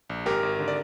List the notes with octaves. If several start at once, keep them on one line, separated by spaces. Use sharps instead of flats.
A#1
G#1 G4 A#4
G#1
D3
D5